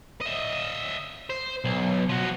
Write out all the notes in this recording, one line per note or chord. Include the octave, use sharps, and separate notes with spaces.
D#5 E5
C5
B1
F3 F#4